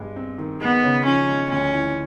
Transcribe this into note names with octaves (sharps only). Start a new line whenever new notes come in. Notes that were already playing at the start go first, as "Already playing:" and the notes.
Already playing: G2 G#3
C4
D#3
G#3 B3
C#3
F3 C#4
G#3
D2 C#4
E3